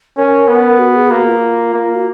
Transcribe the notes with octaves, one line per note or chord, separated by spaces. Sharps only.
C#4 A#4
B3
F#4
G#4
A#3 F#4
F4
A#3
F#4